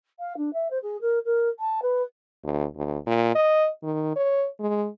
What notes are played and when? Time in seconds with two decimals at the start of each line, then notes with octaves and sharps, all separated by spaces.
0.19 F5
0.37 D4
0.53 E5
0.70 C5
0.82 G#4
1.01 A#4
1.25 A#4
1.59 A5
1.82 B4
2.44 D2
2.75 D2
3.06 A#2
3.35 D#5
3.83 D#3
4.16 C#5
4.60 G#3